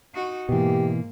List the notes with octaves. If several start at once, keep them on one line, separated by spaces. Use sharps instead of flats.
D#4 F#4
G#2 B2 E3 A#3 G4